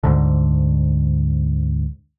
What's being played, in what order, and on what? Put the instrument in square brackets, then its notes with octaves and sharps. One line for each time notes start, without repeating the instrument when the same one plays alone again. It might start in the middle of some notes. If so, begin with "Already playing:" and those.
[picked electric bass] D2 G#2 D3